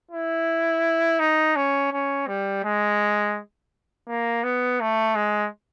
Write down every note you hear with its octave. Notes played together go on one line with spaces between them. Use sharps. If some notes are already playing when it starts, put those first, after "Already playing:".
E4
D#4
C#4
C#4
G3
G#3
A#3
B3
A3
G#3